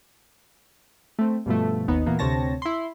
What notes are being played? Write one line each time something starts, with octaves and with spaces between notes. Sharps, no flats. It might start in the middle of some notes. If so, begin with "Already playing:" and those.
A3 C4
G2 B2 F3 A3
G#1 D#2 B3 D#4
A#2 E3 A#3 B3
D2 C3 C4 C#5 A5 A#6
E4 C6